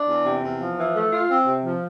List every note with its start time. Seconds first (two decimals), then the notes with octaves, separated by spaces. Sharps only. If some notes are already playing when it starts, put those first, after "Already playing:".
Already playing: D4
0.08 E2
0.25 C3
0.43 E2
0.60 F3
0.78 E3
0.95 A3
1.12 F4
1.30 C4
1.47 C3
1.64 F3